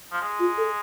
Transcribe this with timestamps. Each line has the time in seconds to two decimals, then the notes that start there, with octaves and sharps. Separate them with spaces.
0.12 F3
0.21 G#3
0.39 F4
0.58 A4